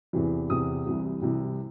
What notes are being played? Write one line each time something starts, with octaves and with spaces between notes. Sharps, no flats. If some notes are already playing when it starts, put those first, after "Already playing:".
E2 C3 E3
E2 C3 E3 D#6
C2 C3 E3
C2 C3 E3